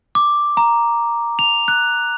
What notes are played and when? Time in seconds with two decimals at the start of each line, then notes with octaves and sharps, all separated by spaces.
0.15 D6
0.57 A#5
1.39 F7
1.68 F#6